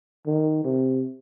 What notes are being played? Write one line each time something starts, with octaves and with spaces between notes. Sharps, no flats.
D#3
C3